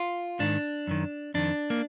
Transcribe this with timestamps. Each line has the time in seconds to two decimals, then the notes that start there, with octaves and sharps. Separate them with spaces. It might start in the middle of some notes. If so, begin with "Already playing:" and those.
Already playing: F4
0.40 G#2 D#3 D4
0.87 F#2 D#3
1.34 F2 D#3 D4
1.70 A#3